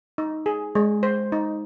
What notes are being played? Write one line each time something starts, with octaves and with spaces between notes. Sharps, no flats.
D#4
G#4
G#3
C5
D#4